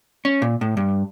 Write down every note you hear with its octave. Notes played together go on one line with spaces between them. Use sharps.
C#4
A#2
A2
G2